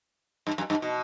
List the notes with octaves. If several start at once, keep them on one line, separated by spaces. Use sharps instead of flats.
G2
F#2
G2
B2